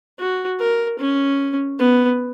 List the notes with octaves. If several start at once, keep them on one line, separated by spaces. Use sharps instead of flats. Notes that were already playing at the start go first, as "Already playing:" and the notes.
F#4
A#4
C#4
B3